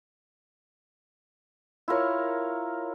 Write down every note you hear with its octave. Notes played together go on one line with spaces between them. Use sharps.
E4 F4 A#4 C#5